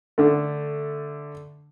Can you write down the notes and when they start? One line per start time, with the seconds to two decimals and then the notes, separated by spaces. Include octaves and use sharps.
0.18 D3 A3